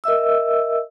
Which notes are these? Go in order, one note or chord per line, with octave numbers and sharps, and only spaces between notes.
A#4 D#5 E5 E6